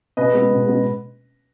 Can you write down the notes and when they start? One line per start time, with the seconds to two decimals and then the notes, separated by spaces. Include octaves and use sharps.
0.17 B2 B4 D#5
0.33 G#3 B3
0.50 B2
0.66 G#3 B3